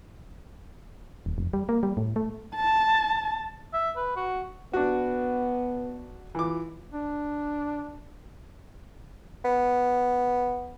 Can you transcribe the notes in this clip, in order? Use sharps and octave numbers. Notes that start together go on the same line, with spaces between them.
D#1
F1
G3
A#3
G3
A2
A3
A5
E5
B4
F#4
B3 D4 F#4
E3 F4 D6
D4
B3